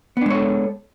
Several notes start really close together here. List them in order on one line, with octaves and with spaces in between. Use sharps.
B3 D4 G#3 C#5 A4